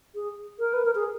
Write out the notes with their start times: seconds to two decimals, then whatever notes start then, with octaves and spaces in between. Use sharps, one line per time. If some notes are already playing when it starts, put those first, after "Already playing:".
0.15 G#4
0.59 A#4
0.73 B4
0.85 A#4
0.95 G#4